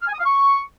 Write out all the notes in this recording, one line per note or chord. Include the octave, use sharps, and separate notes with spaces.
F6
G#5
D#6
F5
C#6